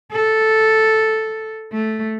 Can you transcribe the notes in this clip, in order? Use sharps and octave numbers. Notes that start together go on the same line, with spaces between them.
A4
A3